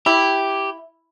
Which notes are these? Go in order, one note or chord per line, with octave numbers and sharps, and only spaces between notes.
E4 G4